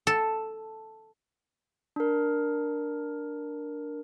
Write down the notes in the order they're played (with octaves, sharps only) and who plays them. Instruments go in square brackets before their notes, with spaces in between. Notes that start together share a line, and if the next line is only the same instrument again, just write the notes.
[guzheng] A4
[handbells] D4 A#4